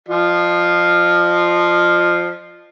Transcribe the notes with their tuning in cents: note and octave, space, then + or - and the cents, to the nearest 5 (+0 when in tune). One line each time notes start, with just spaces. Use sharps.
F3 +0 F4 +0 D#5 -40